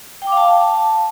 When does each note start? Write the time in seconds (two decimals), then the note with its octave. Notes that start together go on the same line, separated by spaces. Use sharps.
0.22 G5
0.27 D6
0.32 F5
0.37 A5